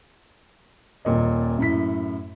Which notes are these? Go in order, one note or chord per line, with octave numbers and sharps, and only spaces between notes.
D#1 A#2 D#5
F#2 A2 B6